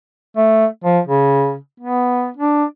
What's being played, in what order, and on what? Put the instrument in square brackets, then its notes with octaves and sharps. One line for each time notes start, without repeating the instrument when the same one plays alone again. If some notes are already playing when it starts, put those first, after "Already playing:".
[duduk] A3
F3
C#3
B3
D4